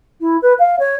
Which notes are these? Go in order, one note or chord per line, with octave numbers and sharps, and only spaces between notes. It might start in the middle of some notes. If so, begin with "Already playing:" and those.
E4
B4
F5
C#5